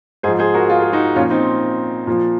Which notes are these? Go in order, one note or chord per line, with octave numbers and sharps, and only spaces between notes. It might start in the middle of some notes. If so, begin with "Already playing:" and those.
G#2 F3 G#4 C5
G#4 C5
F#4 A#4
F4 G#4
G#4
D#4 F#4
A#2 F3 C#4 F4
C4 D#4
A#2 F3